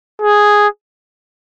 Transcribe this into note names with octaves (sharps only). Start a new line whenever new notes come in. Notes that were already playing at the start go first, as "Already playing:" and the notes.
G#4